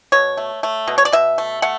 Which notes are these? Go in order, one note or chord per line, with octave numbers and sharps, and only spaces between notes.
B2 C#5
A3
A3
B2
C#5
D5
B2 E5
A3
A3 F#5